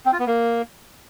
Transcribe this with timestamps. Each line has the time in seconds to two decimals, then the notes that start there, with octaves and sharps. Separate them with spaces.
0.06 C4
0.13 F4
0.20 B3
0.26 A#3